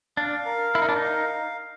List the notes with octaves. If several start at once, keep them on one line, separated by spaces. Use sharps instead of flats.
D4 F5
A#4
E4 A#4
D#4
D4
D#4
F5